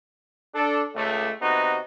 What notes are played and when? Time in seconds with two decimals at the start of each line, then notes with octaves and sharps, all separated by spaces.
0.55 D4 A4
0.95 C#2 A3
1.41 C3 B3 D#4 F#4